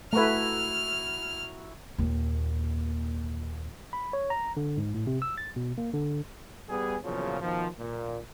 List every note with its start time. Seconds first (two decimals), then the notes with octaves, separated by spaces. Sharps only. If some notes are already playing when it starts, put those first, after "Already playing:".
0.13 A3 E4 F#4 B4 A#5 F6
1.98 D#2 A#2
3.93 B5
4.13 C#5
4.30 A#5
4.57 D3
4.78 G#2
4.94 A2
5.07 C3
5.22 E6
5.38 A6
5.56 B2
5.78 A#3
5.94 D3
6.69 G3 B3 G#4
7.03 E2 A#2 C#3 F3 F#3
7.41 B2 D#3 F3
7.79 A#2